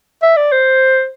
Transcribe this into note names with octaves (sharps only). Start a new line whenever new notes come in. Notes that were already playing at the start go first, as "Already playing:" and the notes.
E5
D5
C5